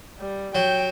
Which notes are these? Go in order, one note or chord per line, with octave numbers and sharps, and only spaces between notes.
G3
F#3 G5